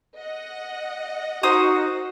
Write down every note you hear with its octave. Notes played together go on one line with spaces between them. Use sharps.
D#5 F#5
D#4 F#4 A#4 C5 D#6